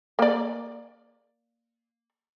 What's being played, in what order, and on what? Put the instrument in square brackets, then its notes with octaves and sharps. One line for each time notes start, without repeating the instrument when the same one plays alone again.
[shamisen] A#3 D5